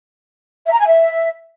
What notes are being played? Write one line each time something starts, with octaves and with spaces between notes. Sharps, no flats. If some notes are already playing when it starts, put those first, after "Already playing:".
E5
A#5
G#5
E5